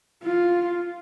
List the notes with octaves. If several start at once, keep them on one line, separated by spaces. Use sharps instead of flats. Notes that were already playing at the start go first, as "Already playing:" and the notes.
F4